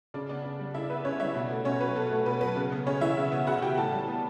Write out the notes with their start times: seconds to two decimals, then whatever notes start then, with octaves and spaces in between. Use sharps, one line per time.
0.14 C#3 D4 D5
0.29 B3 D4 D5
0.44 C#3
0.59 G3
0.74 C#3 E4 E5
0.90 B3 B4
1.05 C#3 C#4 C#5
1.20 G3 E4 E5
1.35 B2
1.51 A3
1.65 B2 C#4 C#5
1.81 F#3 B4
1.96 B2 A4
2.11 A3
2.26 B2 B4
2.41 F#3 B4
2.56 C#3
2.72 B3
2.86 C#3 C#4 C#5
3.01 E3 E4 E5
3.17 C#3
3.32 B3
3.47 C#3 F#4 F#5
3.61 E3 G4 G5
3.77 A2 A4 A5
3.92 G3
4.08 B3